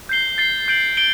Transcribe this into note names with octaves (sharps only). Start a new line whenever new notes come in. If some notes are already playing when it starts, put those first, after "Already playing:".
G6 C7 G7
A6 C7 G7
G6 D7 F#7
D7 G7